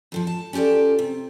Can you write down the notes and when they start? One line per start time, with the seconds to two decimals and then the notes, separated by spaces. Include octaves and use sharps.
0.12 F2 D#3 F3
0.27 A5
0.53 C#4 F4 G4 A4 D5
0.99 C3